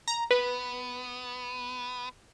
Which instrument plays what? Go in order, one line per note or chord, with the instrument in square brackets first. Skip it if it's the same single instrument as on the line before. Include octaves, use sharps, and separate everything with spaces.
[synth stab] A#5
[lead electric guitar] B3 [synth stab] B4